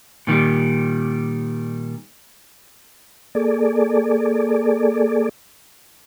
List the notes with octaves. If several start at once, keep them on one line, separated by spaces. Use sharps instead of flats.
A#2 D#3 F#3 G3
A#3 G#4 A4 D5